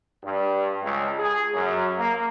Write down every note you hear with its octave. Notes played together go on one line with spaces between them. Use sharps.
G2
C#2
G#4
F#2
A#3